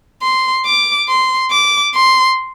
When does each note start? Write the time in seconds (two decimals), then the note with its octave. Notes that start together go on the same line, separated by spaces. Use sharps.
0.22 C6
0.66 D6
1.09 C6
1.51 D6
1.94 C6